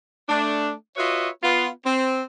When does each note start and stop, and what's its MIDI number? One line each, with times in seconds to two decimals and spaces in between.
0.29 0.72 57
0.29 0.72 62
0.97 1.29 65
0.97 1.29 66
0.97 1.29 71
0.97 1.29 73
0.97 1.29 75
0.97 1.29 76
1.43 1.68 59
1.43 1.68 65
1.85 2.22 60